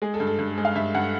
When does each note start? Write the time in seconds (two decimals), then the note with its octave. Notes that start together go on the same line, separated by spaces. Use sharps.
0.02 G#3 G#4
0.14 A4
0.20 G2
0.27 A4
0.39 G2
0.58 G#3
0.65 F5
0.75 G2 E5
0.95 G2 F#5